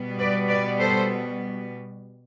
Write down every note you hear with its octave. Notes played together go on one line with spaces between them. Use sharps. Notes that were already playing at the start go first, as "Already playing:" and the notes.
Already playing: B2 G3 B3
B4 D5
B4 D5
A4 C5